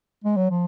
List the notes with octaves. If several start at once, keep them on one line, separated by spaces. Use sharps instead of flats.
G#3
F#3
F3